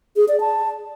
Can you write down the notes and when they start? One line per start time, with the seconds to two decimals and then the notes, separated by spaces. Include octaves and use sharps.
0.16 G#4
0.28 D5
0.40 A5